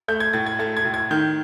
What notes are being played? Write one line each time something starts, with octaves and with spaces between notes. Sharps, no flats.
A3 G6
G#6
A2 A6
G#6
A3 A6
G#6
A2
G#6
D#3 G6